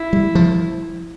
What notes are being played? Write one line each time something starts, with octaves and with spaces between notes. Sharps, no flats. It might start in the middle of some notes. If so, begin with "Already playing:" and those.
Already playing: E4
G3
F3